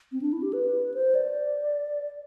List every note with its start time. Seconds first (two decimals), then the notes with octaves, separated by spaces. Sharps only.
0.12 C4
0.22 D4
0.33 E4
0.43 G4
0.53 B4
0.94 C5
1.15 D5